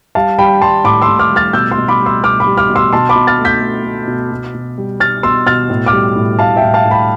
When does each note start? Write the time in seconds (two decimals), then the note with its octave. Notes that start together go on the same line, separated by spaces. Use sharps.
0.15 G3 F5 A5
0.38 G3 G5 B5
0.61 G3 A5 C6
0.84 A2 B5 D6
1.02 C6 E6
1.08 A2
1.19 D6 F6
1.31 G3
1.36 F6 A6
1.53 B2 E6 G6
1.72 C6 E6
1.78 B2
1.88 B5 D6
2.00 G3
2.06 C6 E6
2.23 B2 D6 F6
2.40 B5 D6
2.47 G3
2.57 D6 F6
2.70 B2
2.76 C6 E6
2.93 B2 A5 C6
3.09 B5 D6
3.15 B2
3.27 F6 A6
3.39 A3
3.45 G6 B6
3.61 A3
3.85 A3
4.08 B2
4.32 B2
4.54 B2
4.78 G3
5.00 G3 F6 A6
5.23 B2 C6 E6
5.46 B2 F6 A6
5.70 A2
5.86 D6 F6
5.93 G3
6.16 A2
6.39 A2 F5 A5
6.56 E5 G5
6.62 A2
6.74 F5 A5
6.85 A2
6.91 G5 B5